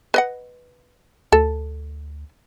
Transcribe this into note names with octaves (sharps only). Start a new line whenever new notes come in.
B4 D#5 F#5
D2 A4